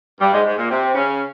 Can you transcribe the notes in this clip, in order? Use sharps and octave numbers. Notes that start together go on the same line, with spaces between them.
G2 G3
G#2 G#3
G#2 G#3
A#2 A#3
C3 C4
C#3 C#4